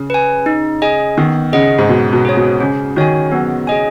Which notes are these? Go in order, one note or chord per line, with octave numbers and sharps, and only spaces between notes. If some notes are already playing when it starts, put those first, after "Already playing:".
Already playing: C#3
B4 G#5
D#4
G#4 D#5 G#5
D#3 B3
C#3 G#4 D#5 F#5
G#2
B2 B3
B2
G#4 C#5
B2
C#3 C#4
D#3 F#4 C#5 G#5
F#3 B3
G#4 D#5 G#5